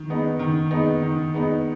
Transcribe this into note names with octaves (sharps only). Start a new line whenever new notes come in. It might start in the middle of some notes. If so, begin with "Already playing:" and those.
Already playing: D#3
G#3 B3 D#4
D#3
G#3 B3 D#4
D#3
G#3 B3 D#4